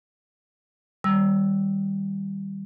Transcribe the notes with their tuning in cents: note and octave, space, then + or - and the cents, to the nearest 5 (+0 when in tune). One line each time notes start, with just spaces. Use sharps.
D#3 +0 G3 +0 E6 +0